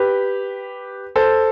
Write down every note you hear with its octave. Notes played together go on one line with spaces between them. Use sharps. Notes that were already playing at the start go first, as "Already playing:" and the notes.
Already playing: G4 B4
A4 C5